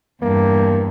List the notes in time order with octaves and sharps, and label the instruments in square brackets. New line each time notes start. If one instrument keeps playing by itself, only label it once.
[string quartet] E2 G2 [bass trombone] A#3